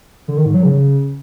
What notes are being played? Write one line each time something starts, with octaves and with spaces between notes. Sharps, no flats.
D3
D#3
G#2
F#3
C#3